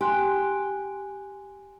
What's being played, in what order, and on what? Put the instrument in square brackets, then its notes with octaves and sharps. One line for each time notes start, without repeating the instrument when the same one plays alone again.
[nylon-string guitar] G4 [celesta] G#5 C6 F#6